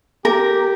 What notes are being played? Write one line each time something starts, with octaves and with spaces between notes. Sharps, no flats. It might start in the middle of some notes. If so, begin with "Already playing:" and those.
G4 A#4